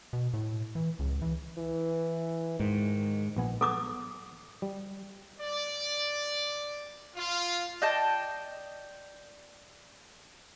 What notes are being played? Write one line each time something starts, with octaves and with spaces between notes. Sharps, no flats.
B2
A2
E3
C#2
E3
E3
G#2 D#3
A#1 B3 G#5
B3 G#4 A4 D6 D#6
G3
D5
F4
D5 D#5 G5 A5